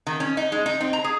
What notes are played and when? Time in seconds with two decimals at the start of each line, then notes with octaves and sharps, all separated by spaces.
0.07 D#3
0.20 C#4
0.37 D#4
0.52 G#3
0.66 D#4
0.81 C4
0.93 A#5
1.04 G#4